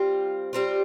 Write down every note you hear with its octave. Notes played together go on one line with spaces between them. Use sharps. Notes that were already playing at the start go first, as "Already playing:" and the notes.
Already playing: G3 C4 F4
G3 C4 F4